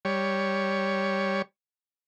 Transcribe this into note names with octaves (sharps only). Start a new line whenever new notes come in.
G3 C#5